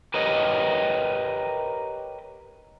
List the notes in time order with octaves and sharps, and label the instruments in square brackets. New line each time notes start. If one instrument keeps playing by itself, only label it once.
[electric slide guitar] G4 A#4 B4 C#5 D#5